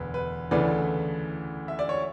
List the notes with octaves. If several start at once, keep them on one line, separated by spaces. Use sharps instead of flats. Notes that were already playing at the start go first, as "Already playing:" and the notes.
Already playing: E1 D2 B4
B4
D2 C#3 E3 A3 B4 D5
E5
D5
C#5